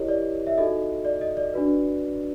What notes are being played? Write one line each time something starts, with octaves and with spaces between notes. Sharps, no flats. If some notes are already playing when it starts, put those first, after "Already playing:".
Already playing: E4 G4 A#4 C#5 D#5
D5
E5
D#4 F#4 A4 D#5
D5
D#5
D5
D4 F#4 B4